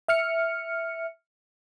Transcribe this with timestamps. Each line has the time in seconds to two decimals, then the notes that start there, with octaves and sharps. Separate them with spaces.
0.08 E5 F6 C#7